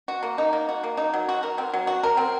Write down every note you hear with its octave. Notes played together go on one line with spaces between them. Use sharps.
F#4
A#3
D#4
A#3
F#4
A#3
D#4
F#3
F#4
A#4
C4
F#3
F#4
A#4
C4